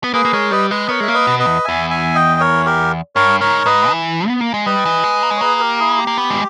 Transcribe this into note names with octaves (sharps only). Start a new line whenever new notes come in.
B3
A#3 G#4 B4
A#3
G#3 A#4 C#5
G3 B4 D#5
G#3 B4 D#5
B3 A#4 C#5
G#3 E5
A#3
B4 D#5
B2
B4 D#5
E2
E2 E5 G#5
E5 G#5
D#5 G5
A#4 C#5
G4 A#4
G2 A#4 C#5
G#2 A#4 C#5
G#2 B4 D#5
E3
B3
A#3
G#3
G3 B4 D#5
E3
G#3
A#3
G#3
C#5
A#3 G#4 B4
G4 A#4
E4 G#4
G4
A#3
B3
G#3